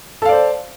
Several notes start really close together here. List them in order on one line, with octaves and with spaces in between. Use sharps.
A4 F5 D5 C5